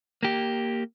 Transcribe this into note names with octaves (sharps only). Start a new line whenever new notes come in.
A#3 G4